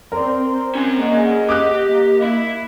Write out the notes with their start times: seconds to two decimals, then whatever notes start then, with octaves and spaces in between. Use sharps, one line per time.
0.12 C4 A#4 D5 C6
0.75 C#4 A#5
0.97 A#3 G#4 D#5 F#5
1.49 G4 D6 D#6 F#6
1.89 A#3
2.23 E4 E5